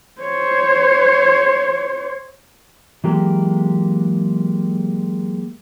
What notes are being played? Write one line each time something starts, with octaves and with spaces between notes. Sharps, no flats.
C5 C#5
E3 F#3 G#3 A#3 G4